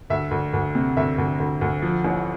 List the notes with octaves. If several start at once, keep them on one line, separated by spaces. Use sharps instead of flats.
D2 E5
D2
D2
C3
D2 E5
D2
D2
D2
F3
A1